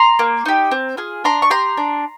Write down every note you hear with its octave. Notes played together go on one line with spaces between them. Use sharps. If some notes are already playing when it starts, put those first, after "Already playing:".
Already playing: A#5 C6
A#3
D#4 G4
C4
F4 G#4
D4 A#5 C6
C#6
G4 A#5 C6
D4